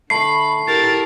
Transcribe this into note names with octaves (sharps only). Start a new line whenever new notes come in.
D3 A3 B5 C#6 C7
E4 G4 A#4 A6